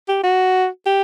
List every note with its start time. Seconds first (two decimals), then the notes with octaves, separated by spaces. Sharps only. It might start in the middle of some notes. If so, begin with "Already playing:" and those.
0.08 G4
0.23 F#4
0.86 G4